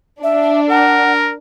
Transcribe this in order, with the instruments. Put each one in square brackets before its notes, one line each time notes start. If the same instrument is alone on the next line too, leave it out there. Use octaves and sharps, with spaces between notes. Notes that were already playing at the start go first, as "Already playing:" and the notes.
[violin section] D4 [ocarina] E5
[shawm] A#4 [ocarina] F#5